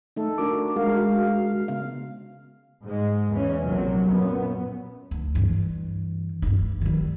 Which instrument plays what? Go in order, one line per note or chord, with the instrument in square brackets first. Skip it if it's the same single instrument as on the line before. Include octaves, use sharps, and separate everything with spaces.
[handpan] A3 D#4 [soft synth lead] A4
[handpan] D4 F#4 A#4 [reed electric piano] D6
[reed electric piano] G#3 F#4 [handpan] A#4 [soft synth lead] F5
[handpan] C#3 B3 F5
[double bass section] G#2 G#3
E2 E3 C#4
A#1 C3 F#3
F#2 A#2 B3
[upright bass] D2
G2 E3
G2 D#4
D#3 G3